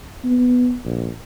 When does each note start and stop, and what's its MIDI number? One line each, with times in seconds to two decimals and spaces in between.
0.24 0.75 59
0.84 1.09 34